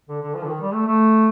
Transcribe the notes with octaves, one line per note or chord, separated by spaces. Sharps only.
D3
D3
F3
D3
D#3
G3
A3
A3